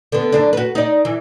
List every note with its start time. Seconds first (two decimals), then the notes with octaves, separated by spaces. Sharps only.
0.12 D3 B3
0.32 F#2 D3 D4
0.53 F#4 B4
0.75 D#4 D5
1.05 E3